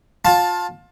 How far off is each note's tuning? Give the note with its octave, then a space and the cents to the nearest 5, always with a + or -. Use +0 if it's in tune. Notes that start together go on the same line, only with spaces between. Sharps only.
F4 +25 A5 +0